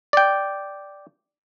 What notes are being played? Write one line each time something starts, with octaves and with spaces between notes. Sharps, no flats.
D5 G5